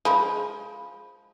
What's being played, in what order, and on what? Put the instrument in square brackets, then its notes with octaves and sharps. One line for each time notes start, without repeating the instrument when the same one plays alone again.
[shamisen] F3 G#3 [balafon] B5